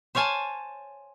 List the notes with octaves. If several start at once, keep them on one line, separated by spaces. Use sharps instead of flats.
C5 C#5 F5 G#5 A5